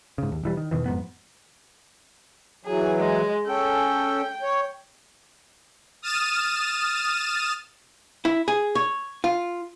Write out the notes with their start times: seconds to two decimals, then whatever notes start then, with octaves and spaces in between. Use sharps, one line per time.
0.18 G#2 C#3
0.32 D#2
0.43 E1 E3 G3
0.57 D#3
0.71 E2 B2 D#3 E3
0.86 F2 G#2 B3
2.65 E3 F#3 G#4
2.98 G#3
3.47 C#4 A4 G5
4.42 C#5
6.02 D#6 F6 A6 D#7 E7
8.25 E4
8.48 G#4
8.75 C#5
9.24 F4